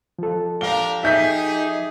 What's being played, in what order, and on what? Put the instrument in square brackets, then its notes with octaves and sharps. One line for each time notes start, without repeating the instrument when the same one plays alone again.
[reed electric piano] F3 A4
[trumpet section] D4 G4 A#4 [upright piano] F5 G7
[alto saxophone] D#4 [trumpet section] G4 G#4 [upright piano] E5 G6 B6